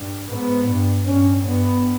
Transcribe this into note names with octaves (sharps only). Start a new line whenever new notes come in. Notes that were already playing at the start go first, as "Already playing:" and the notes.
Already playing: G2
G#2 B3
G2
G2 C#4
G2 B3